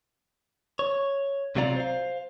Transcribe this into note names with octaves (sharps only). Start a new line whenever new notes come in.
C#5
C2 C3 F#3 F4 D5 A#5
C5 F5